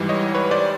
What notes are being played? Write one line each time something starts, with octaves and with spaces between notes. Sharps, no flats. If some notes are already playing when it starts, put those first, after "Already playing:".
Already playing: G#2 E3 G3
C#5 D#5
B4 C#5
C5 D5